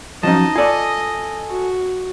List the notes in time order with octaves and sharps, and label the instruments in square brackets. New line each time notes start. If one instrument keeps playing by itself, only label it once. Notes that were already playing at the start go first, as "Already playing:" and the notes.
[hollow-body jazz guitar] F3 F#3 C#4 [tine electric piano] D#4 A5 [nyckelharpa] D#5
[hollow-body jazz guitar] F4 D5 [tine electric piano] A4 G#5
[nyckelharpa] F#4